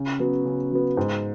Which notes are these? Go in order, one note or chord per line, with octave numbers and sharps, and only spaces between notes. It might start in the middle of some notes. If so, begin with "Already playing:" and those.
Already playing: C#3
F#3 B3
C#3
F#3 B3
G#2